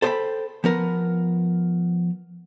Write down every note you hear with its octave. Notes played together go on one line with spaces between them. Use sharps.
A4 C5 D#5 F5 G5 B5
F3 B3 A#4 B4